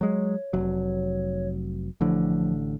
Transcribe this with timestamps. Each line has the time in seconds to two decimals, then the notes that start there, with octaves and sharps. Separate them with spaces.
0.01 F#3 G#3 C#5
0.53 F1 F#3
2.01 A1 A2 D3 F3